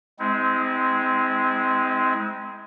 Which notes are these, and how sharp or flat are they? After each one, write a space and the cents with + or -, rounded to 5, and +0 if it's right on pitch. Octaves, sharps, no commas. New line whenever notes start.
G#3 +5 C4 -15 E4 -40